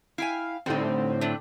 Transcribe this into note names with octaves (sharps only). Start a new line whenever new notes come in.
E4 F5 G5 G#5
A2 D3 G3 C4 D#4
A3 D4